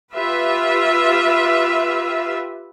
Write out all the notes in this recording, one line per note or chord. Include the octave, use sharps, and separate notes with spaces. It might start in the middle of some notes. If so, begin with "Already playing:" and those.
F4 G4 B4 E5